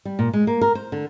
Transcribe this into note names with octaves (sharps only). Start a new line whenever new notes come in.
G3
A#2
G#3
A#3
A#4
C5
D3